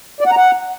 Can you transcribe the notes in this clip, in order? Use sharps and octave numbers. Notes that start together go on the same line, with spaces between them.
D5
F#5
A#5
F#5